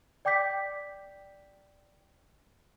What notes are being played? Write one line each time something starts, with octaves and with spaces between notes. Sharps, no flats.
D5 G5 D6 G6 B6